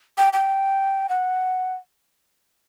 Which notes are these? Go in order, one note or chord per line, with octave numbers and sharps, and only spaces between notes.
G5
G5
F#5